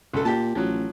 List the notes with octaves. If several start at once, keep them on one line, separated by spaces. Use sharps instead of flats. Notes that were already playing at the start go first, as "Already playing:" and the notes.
C#2 A4
A#2 G4 A5
A1 F3 F#3